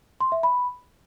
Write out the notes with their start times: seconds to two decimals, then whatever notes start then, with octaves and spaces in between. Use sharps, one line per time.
0.21 C6
0.32 E5
0.43 B5